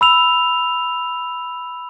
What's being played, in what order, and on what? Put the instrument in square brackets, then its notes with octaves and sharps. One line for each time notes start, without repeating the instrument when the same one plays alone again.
[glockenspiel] B5 E6 F7